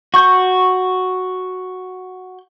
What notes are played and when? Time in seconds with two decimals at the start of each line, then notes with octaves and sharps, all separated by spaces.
0.14 F#4 C#6 G6